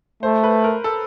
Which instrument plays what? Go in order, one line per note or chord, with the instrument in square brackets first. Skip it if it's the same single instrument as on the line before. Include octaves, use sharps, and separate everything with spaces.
[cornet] A3 [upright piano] C5
[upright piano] B4
A#4
A4